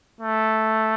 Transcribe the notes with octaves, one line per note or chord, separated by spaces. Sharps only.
A3